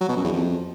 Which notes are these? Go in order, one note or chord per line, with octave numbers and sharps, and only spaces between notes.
F#3
B2
F#2
E2
F2